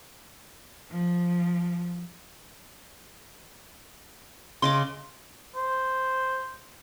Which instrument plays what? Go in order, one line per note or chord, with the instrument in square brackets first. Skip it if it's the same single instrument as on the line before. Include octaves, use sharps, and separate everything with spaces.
[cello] F3
[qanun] C#3 D#5 D6 [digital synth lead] C6
[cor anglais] C5